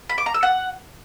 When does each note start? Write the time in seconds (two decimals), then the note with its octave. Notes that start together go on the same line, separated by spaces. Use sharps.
0.09 B5
0.18 D6
0.26 A#5
0.34 E6
0.43 F#5